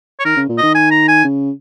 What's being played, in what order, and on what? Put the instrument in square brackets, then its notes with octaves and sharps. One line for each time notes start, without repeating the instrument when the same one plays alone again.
[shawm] C#5
[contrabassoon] D#3 [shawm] A#4
[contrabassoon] C#3
A#2
[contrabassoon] D#3 [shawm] D#5
[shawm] G#5
A#5
G#5
[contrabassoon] C#3